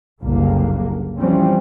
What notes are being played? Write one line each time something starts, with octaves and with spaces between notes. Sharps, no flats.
F#1 C2 D3 A#3
E3 F3 G3 C4 C#4